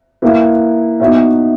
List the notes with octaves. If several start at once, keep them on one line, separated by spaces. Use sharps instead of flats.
A#3 E4 B4
B3 D#4 F#4 C#5 E5